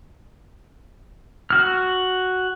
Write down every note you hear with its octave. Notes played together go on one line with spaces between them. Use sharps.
F#4 F6